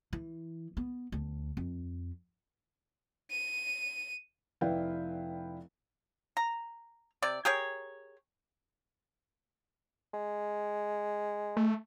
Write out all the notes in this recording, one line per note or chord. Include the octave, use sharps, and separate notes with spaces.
E3
B3
D2
F2
D#7
F1 E4 B4 D5 F5 G5
A#5
C3 D5
G4 G#4 A#4 C#5
G#3
A3